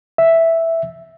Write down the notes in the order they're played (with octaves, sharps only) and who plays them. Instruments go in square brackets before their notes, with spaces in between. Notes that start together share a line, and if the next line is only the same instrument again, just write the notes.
[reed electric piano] E5